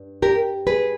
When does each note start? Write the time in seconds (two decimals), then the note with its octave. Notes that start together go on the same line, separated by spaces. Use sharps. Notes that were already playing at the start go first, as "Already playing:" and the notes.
Already playing: G2
0.22 G4 A#4
0.67 G#4 B4